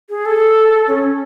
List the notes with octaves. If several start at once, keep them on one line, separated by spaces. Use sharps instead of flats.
G#4
A4
C#4